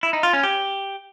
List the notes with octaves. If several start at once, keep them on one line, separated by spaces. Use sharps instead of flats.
E4
D#4
F4
C#4
G4